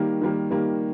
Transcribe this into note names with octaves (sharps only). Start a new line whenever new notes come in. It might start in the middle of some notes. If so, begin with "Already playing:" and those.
Already playing: D#3 G3 A#3
D#3 G3 A#3
D#3 G3 A#3